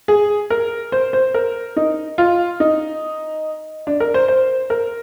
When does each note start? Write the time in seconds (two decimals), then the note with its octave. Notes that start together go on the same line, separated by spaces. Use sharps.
0.08 G#4
0.50 A#4
0.92 C5
1.13 C5
1.34 A#4
1.77 D#4
2.18 F4
2.60 D#4
3.87 D4
4.00 A#4
4.14 C5
4.28 C5
4.70 A#4